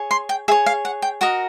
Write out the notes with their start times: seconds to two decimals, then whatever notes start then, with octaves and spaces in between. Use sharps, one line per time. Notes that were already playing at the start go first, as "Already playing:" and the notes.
Already playing: G#4 C#5
0.11 C6
0.29 G5
0.48 G#4 E5
0.51 C#5
0.66 F5
0.85 F#5
1.02 G5
1.21 F#4 A#4 D#5 F#5